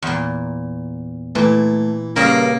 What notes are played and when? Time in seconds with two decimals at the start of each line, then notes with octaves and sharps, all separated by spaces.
0.02 E2 A#2
1.35 A#2 E3 A3
2.16 G2 C#3 A#3 C#4 A#4